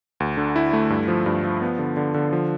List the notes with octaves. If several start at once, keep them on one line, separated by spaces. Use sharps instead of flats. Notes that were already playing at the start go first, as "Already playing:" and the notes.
D2
D3
E4
A3
G2
F3
G2
F3
B3
D3
D3
D3
F3